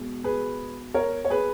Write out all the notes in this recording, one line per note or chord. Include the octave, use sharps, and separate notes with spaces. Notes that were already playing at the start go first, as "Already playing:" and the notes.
Already playing: B2 G#3
G#4 B4
A#4 C#5
C#5
G#4 B4